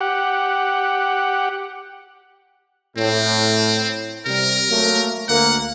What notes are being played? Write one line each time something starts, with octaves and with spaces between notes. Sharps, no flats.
G4 F#5
A2 C4
C3 G3 A#4
F#3 A3 A#3
D2 A#3 F#5